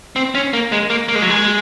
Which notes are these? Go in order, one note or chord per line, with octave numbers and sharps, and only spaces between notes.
C4
C#4
A#3
G#3
A#3
A#3
G#3
F#3
G#3